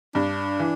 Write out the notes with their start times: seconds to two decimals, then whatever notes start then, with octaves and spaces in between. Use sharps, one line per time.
0.15 G2 D4
0.59 E3